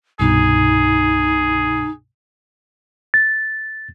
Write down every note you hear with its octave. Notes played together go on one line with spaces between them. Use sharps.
C2 G2 B2 D#4 G#4
A6